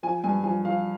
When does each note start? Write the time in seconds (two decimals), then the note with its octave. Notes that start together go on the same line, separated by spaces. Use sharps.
0.03 F3 G#5
0.24 G2 G#5
0.44 F3 G#5
0.65 F3 F5